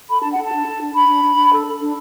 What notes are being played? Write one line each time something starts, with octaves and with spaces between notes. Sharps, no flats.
A4 B5
D4 A5
F#5
A4
A5
D4
A4
D4
D4 B5
D4
D4
D4
A4
A4
D4